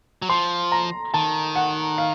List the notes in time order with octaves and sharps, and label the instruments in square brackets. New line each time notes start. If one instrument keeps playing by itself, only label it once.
[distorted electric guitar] F#3
[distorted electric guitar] F3 [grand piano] C6
[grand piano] A#5
[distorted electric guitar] D#3 [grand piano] A5
[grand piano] F#5
F5